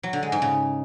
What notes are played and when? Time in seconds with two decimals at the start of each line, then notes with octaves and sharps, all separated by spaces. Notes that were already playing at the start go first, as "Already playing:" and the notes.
0.03 F#3
0.13 D3
0.23 G#3
0.32 G#2
0.42 C#3